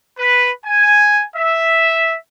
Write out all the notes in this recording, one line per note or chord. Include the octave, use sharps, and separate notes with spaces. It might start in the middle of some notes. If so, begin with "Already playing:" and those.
B4
G#5
E5